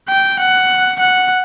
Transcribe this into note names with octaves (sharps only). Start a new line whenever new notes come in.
G5
F#5
F#5